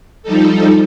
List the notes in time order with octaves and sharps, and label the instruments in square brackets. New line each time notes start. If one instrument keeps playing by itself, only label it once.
[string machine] F3 G3 D#4 A4